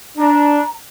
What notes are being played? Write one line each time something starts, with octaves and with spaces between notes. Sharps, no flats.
D4 A#5